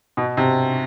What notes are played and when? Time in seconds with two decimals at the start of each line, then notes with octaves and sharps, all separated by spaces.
0.17 B2
0.37 C3